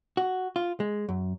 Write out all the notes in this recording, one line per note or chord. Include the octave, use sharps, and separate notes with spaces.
F#4
F4
G#3
F#2